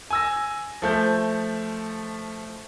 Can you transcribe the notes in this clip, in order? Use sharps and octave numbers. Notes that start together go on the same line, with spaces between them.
G#5 E6 A#6
F3 A3 G6